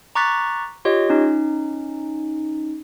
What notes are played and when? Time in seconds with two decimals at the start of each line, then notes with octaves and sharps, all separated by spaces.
0.15 A#5 C#6 D6 F#6 A6 B6
0.85 F4 G4 C#5 D#5
1.09 C#4 D#4